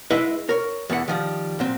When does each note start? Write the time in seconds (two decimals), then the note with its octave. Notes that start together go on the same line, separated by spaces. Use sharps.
0.11 G#3 E4 B4 D#5 E5
0.49 A#4 C#5
0.90 E2 A2 E3 F#5
1.08 D#3 F3 G3
1.59 A#2 F#3 C4